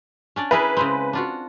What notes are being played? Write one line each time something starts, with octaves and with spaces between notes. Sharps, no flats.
C#4 D4 D5
E4 G#4 A#4 B4
C#3 G#3 C4
D4 F4 F#4